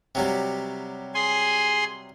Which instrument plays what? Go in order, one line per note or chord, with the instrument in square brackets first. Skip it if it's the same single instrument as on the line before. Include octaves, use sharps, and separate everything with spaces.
[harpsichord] C3 F#3 G3
[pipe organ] G#4 G#5 C6